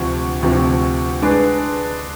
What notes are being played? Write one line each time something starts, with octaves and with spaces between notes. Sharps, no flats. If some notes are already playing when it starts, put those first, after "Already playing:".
Already playing: D2 C3 F3
D2 C3 F3
G#3 D4 G#4 B4